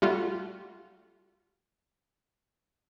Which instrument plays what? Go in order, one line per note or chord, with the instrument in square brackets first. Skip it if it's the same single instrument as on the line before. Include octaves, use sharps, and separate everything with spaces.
[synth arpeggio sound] G3 A3 F4 F#4